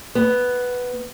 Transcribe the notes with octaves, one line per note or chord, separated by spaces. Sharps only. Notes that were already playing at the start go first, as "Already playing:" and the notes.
B3